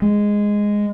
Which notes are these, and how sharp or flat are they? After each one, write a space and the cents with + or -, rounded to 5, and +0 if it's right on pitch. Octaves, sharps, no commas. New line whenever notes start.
G#3 -5